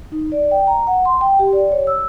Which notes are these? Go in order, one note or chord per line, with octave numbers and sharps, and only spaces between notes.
D#4
D5
G5
A#5
F#5
C6
G5
G4
D5
C#5
E6